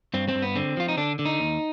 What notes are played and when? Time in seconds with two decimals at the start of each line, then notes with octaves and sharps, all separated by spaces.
0.14 G2 C4
0.29 C4
0.35 G2
0.42 B3
0.55 D3 C4
0.77 F3 F4
0.88 D#4
0.97 D3 D4
1.19 D3
1.25 D#4
1.39 D#2